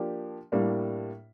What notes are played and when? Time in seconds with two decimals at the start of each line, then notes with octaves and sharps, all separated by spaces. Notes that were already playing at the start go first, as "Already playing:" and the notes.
Already playing: F3 A#3 D4 G4
0.52 A2 G3 A#3 D4